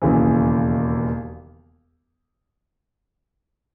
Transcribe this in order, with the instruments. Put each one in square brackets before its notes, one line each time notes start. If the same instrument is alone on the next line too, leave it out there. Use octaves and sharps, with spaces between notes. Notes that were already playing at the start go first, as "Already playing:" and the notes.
[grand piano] E1 D#2 C#3 E3